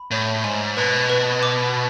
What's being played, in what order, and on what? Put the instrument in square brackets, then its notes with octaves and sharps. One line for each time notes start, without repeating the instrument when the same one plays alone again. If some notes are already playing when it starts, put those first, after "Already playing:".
Already playing: [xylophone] B5
[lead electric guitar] A2 [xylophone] C#5
[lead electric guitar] G#2 [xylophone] G#5
[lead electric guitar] B2 [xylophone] B4
[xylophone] B4
D6